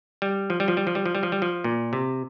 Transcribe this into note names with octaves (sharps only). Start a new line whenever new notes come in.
G3
F3
G3
F3
G3
F3
G3
F3
G3
F3
G3
F3
A#2
C3